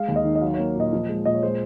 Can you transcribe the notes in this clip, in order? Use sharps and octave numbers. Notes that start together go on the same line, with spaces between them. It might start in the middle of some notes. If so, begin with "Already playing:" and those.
Already playing: G#3 F5
D#2
D#5
D#3
D#5
F#3 F5
A#3 C#5
A#2 D#5
F3
G#3
A#2 D#5
C#5
G#3 C5